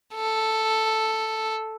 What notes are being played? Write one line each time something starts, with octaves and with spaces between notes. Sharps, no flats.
A4